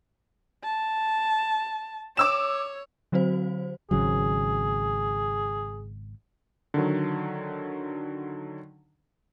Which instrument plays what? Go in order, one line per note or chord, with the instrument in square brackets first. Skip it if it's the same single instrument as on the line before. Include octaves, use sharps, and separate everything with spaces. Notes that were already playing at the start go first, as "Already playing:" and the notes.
[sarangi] A5
[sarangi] C#5 [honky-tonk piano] D6 E6 E7
[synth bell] D3 F#3 C4 F#4 C5
[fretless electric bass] G#1 C#3 F#3 [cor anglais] G#4
[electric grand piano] D3 D#3 F#3